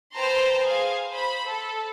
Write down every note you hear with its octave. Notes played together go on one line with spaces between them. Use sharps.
B4 C5 G5 A5 A#5 C6
G#4 F5
C5 B5
A4